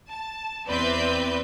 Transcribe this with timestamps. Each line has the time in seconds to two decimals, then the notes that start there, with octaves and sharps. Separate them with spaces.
0.11 A5
0.69 E2 C4 B4 D5 E5 G6